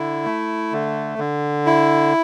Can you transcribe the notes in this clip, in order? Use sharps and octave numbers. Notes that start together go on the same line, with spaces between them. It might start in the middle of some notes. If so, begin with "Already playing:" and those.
Already playing: D3 E4
A3
D3
D3
E4